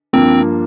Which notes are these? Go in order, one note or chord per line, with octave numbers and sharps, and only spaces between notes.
G2 F3 A#3 C4